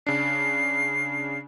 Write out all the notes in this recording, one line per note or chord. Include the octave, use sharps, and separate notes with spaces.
C#3 D4 C7